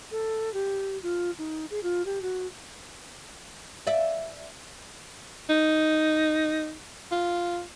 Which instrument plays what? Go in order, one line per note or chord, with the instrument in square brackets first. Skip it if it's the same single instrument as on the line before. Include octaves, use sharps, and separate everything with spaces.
[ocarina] A4
G4
F4
D#4
G#4
F4
G4
F#4
[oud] D5 E5
[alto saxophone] D#4
F4